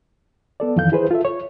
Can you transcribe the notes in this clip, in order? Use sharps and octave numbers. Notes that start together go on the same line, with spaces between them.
B3 A4 D5
F2 D#3 E3 F5 G6
E4 G#4 B4 C5
F4 A4 E5
C#5